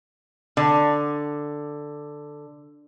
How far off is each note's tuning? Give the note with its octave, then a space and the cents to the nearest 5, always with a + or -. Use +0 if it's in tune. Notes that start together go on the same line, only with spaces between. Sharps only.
D3 +5